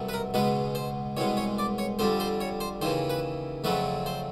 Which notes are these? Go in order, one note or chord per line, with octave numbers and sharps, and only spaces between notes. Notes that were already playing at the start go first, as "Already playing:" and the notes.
Already playing: C2 B2 F#3 A3
B4
A#4
C#2 B2 G#3 B4
C5
C2 B2 G#3 C#5
C#5
D5
C#5
F2 D3 G3 C5
C5
C#5
C5
D#2 C#3 E3 C5
B4
F2 C#3 F#3 A3 B4
C5